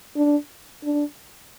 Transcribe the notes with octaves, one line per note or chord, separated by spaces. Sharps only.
D4
D4